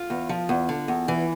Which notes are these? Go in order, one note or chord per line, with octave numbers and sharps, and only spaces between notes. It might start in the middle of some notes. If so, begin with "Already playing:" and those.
Already playing: F4
E2
F3
E2
D3
E2
E3